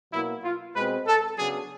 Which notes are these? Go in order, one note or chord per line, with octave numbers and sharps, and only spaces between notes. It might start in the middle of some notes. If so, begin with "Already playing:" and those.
B2 F#3 A#3 E4
F4
B2 G#3 C4 B4
A4
C#3 F#3 B3 D4 G#4